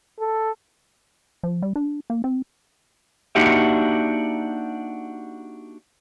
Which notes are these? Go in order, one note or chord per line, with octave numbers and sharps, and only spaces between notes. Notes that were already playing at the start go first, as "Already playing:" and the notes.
A4
F3
G3
D4
A#3
C4
A#3 D4 D#4 F#4 G4 E5